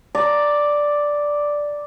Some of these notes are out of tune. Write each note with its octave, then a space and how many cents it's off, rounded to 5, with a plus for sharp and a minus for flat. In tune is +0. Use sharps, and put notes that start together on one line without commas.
D5 +0 A#5 +0